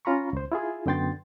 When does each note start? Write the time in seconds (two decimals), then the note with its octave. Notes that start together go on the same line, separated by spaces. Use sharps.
0.05 C#4 F4 A#5 B5 C#6
0.33 C#2 C5
0.52 E4 F4 G#4
0.86 F#2 D3 B3 G5 C6 A6